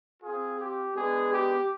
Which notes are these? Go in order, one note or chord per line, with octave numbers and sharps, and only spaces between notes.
C4 F4 G#4
G4
G#3 B3 D4 G#4
G4